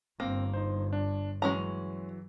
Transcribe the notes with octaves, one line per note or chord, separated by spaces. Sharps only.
G1 A#3 C4
D#4 C5
D4
E3 F#3 G#3 C#4 A#5